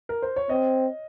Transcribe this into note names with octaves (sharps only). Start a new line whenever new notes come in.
A#4
C5
C#5
C4 D#5